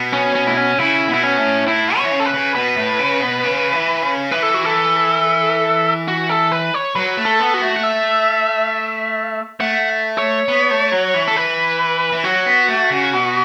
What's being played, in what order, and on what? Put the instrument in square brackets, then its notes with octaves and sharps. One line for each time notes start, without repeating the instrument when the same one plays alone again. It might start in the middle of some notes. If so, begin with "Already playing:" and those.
Already playing: [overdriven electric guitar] B2
[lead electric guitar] C#4
C#4
E4
C#4
[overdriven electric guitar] C#3 [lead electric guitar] E4
[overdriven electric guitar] B2
[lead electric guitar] E4
C#4
[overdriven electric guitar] A2
[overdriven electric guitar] A2 [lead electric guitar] E4
[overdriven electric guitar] B2
[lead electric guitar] C#5
[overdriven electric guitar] E3
C#3
[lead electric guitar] A4
B4
[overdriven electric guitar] C#3
[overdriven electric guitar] B2 [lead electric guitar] B4
[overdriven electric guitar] A2
C#3
B2
C#3
E3
C#3
[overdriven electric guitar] E3 [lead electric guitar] B4
[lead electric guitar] A4
F#4
A4
F#4
A4
B4
C#5
[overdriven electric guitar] F#3 [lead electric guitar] B4
[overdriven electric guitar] A3
[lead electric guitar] A4
[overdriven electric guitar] B3
[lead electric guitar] F#4
[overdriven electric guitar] A3
[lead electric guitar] F#5
E5
[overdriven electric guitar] A3 [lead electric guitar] F#5
[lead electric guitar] C#5
[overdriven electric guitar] B3
A3
F#3
E3
[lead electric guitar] A4
B4
[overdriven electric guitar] E3
[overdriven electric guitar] F#3 [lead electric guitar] F#4
[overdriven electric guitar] B3
A3
C#3
B2